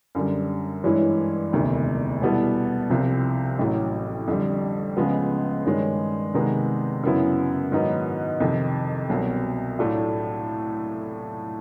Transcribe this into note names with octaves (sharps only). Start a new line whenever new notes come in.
F#2 D3 G3
G2 E3 G#3 C#4 E4
E1 D2 C3 D#3
B2 G3 B3 E4 A4
C2 C3 F3
A1 A2 F#3
F2 D3 G3
C#2 C#3 F3 G#3 B3
G2 D#3 G#3 C#4
C3 D#3 G#3 B3 D#4
F#2 C#3 F#3 B3 E4
G#2 D#3 F#3 B3 D#4
F2 C3 D#3
C2 B2 F#3
A2 F#3 A3 D4 F4